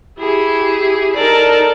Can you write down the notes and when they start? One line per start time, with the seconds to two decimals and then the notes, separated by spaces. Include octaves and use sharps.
0.18 E4 G4 G#4
1.15 D#4 A4 A#4 D5